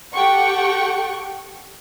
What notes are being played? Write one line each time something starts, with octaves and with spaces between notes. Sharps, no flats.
G4 A4 F#5 G5 C#6